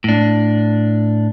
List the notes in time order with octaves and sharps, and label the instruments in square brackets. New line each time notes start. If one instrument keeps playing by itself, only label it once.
[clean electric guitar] A2 D4